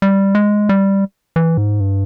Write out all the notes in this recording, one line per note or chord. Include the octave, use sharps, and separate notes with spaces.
G3
G#3
G3
E3
G#2
G2